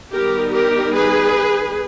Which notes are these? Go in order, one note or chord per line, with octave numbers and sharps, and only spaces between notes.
D#3 G3 B3 D#4 G4 A#4
G4 A#4
G#4 B4